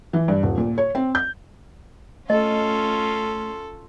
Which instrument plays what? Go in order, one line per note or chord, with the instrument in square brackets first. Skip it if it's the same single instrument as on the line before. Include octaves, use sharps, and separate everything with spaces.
[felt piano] E3
G2
D#1
A#2
C#5
C4
G6
[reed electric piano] A3 [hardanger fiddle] C#4 F4 [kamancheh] A4 [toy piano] D#5